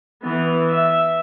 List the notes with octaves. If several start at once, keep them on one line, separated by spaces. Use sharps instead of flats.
E3 B3
E5